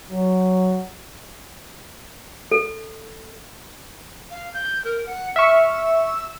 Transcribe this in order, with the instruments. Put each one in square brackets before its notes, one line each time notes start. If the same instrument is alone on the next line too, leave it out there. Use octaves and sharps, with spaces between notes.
[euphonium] F#3
[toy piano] A4
[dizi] F5
G6
A#4
F#5
[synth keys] E5 C#6 [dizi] F6
[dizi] E6